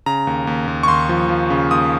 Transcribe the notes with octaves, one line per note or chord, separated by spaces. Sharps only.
C#3 A#5
D#2
D#2
D#2
C#6
D#2 C6
F3
F3
C#3
D#2 D#6